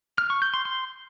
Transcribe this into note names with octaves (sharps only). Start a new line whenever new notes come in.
F6
C#6
G6
C6
C6